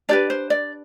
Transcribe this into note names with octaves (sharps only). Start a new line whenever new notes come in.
D4 G4 B4 D5
C5
D5